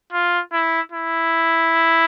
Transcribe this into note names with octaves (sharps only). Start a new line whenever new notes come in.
F4
E4
E4